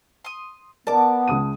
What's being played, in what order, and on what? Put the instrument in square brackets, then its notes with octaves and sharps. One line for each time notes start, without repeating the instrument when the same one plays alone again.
[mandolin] C6 D#6
[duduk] B3 [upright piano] A#4 D5 [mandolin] A5 D6
[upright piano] C#2 D#6 D#7